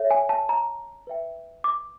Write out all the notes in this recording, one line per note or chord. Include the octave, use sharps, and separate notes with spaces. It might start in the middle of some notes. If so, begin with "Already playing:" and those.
Already playing: A4 C#5 E5
G#5
A5
A#5
B4 E5 G5
D6